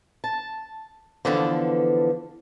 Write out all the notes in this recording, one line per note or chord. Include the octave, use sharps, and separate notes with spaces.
A5
D3 E3 F3 B3 A4